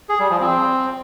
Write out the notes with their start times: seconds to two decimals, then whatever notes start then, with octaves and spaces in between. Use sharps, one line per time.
0.09 G#4
0.20 G3
0.30 F3
0.41 C4